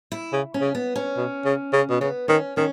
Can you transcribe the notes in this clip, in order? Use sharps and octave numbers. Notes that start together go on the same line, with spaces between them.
E4
C#3
C#4
C#3
B3
C#4
B2
C#3
C#3
B2
C#3 B3
D#3 C#4
D#3 C#4